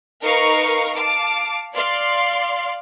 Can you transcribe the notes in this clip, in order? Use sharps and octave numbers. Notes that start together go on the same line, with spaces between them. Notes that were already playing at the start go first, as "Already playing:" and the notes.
D#4 A#4 B4 F5 A#5 C#6
F5 A5 D6
D5 F5 C6